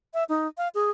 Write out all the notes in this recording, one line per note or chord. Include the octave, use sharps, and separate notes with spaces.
E5
D#4
F5
G#4